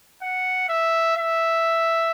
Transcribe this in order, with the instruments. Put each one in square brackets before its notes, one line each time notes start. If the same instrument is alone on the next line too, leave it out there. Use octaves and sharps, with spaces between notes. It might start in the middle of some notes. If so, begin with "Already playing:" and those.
[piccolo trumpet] F#5
E5
E5